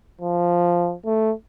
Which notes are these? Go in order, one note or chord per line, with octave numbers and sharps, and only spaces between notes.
F3
A3